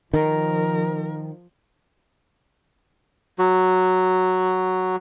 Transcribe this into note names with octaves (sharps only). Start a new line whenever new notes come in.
D#3 F3 A#4
F#3 F#4